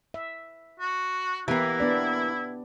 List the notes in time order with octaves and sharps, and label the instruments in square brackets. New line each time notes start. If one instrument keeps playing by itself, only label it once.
[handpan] E5
[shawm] F#4
[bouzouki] E3 A#3 [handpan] B3 G4 [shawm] E4
[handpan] B3 D4 D5